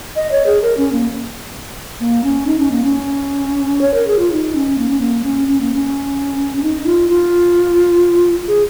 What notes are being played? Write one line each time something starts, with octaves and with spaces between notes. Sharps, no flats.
D#5
C#5
G#4
A#4
C#4
A#3
A#3
C#4
D#4
C#4
A#3
C#4
C#5
A#4
G#4
F4
D#4
C#4
A#3
C#4
A#3
C#4
C#4
A#3
C#4
C#4
D#4
F4
F4
G#4